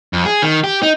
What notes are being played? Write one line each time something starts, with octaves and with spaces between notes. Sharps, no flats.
F2
G#4
D#3
G4
D#4